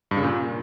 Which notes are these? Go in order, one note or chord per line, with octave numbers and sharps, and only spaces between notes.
G2
C#3
A#2